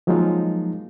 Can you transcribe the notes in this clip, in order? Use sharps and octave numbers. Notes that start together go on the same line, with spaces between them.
F3 F#3 G#3 A#3 D#4 F4